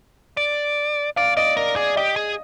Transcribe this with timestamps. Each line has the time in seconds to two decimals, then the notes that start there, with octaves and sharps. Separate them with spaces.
0.37 D5
1.16 D5 F5
1.37 D5 D#5
1.56 A#4 D5
1.76 G#4 D5
1.96 G4 D#5
2.16 G#4